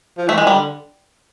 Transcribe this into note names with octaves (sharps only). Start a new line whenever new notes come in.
F3
E3 A3
D#3 G#3
G3
D3